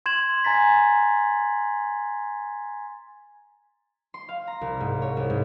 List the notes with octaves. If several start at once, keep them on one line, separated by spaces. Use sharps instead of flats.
C6 G#6 E7 F#7
G#5 A#5 A6 B6
C6
F5
A#5
C2
G#2
C#5
C2
G#2